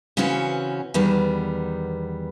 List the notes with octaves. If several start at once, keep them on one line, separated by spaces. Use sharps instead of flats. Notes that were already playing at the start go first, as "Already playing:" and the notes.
C#3 E3 C4 C#4 F#4
E2 D#3 G3 B3